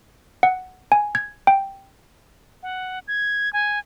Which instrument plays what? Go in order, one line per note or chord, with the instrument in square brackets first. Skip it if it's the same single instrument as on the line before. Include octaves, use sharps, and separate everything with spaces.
[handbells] F#5
G#5
G#6
G5
[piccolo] F#5
G#6
G#5